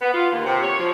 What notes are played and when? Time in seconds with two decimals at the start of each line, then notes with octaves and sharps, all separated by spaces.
0.02 B3
0.14 F4
0.32 D#2
0.46 C3
0.63 C#5
0.79 F3